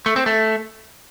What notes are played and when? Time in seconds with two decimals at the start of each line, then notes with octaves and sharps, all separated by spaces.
0.06 A3
0.16 C4
0.26 A3